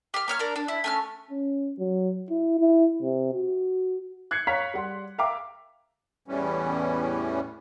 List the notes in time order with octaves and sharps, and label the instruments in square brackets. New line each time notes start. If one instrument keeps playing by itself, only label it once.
[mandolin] G4 F6
A#3 C#5 F6
D4 A#4
D4
E4
A3 C#4 F6
[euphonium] C#4
F#3
E4
E4
C3
F#4
[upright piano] F#6 G#6 C7 C#7
C#5 F5 A#5 B6
G3 F#5 C6
E5 F5 G5 A#5 D6
[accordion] E2 A2 E3 G3 C#4